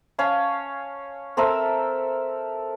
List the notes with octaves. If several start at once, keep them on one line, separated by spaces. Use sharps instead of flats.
C#4 C#5 F5 A5
C4 A4 A#4 E5